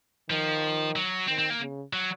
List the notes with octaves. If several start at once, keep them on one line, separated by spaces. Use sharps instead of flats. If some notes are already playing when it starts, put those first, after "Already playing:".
D#3 F3
F#3
D#3 C4
C4
A#3
C#3
F#3